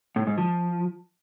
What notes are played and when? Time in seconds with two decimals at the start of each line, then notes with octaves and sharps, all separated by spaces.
0.16 A2
0.27 G#2
0.38 F3